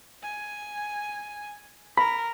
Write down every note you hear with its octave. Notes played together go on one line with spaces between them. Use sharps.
G#5
A#4 B5